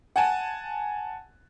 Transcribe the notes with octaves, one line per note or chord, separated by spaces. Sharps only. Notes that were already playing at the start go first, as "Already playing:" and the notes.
F#5 G#5 A5